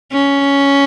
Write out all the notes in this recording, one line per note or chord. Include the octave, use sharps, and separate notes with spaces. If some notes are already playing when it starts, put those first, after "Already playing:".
C#4